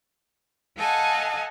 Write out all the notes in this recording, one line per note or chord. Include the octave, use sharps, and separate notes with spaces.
A4 D#5 F5 F#5 G#5 A5